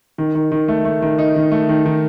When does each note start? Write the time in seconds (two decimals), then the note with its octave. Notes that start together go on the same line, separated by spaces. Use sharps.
0.18 D#3
0.35 D#3
0.52 D#3
0.68 A3
0.85 A3
1.02 D#3
1.19 D#4
1.36 D#3
1.52 A3
1.69 D#3
1.86 D#3